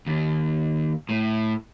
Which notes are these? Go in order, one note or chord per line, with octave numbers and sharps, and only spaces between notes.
D#2
A2